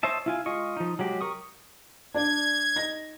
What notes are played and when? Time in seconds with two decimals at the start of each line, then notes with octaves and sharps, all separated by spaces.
0.03 C5 C#5 D#5 E5 A5
0.26 E4 F4 G#5
0.46 G#3 F4 D#5 C#6
0.77 F3 D#4
0.99 F#3 G#3 G4
1.21 A#4 C#6 D#6
2.15 D4 D5 G#6
2.76 D#4 A#6